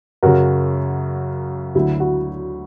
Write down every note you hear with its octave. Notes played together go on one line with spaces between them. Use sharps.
F#2 C#3 F#3 F#4 A#4
D2 D3 F#3 E4
F#4